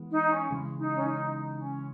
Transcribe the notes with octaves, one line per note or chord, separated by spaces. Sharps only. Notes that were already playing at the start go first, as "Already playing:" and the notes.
Already playing: E3 G#3 B3
D#4
C#4
C#3 E3 G#3
D#4
C#4
D#4
D#4
C#4